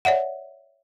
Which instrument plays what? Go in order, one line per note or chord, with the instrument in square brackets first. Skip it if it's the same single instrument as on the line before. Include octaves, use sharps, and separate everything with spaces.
[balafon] C#5 D5 E5 F#5